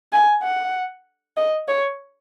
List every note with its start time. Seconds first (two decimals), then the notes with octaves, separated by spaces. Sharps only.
0.13 G#5
0.43 F#5
1.37 D#5
1.68 C#5